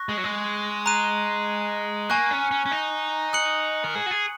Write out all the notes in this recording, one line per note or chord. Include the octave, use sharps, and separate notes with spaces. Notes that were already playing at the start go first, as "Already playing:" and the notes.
Already playing: C#6 F#6 A#6
G#3
F#3
G#3
A#5 F#6 D#7
A#3 G#5 C#6 F#6
C#4
C#4
C#4
D#4
D#6 F#6 C#7 F#7
A#4
G#4
F#4
G#4